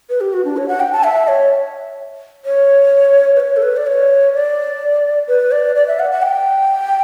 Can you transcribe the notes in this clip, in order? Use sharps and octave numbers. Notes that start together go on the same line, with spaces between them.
B4
G4
F#4
D4
C#5
F#5
G5
A5
E5
C#5
C#5
B4
C#5
A4
B4
D5
C#5
D5
B4
D5
D5
E5
F#5
F#5
G5